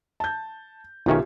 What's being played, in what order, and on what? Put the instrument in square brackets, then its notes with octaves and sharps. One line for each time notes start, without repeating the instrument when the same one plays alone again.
[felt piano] A5 G6
[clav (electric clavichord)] B1 D#3 C#4 [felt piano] F4 G4 E5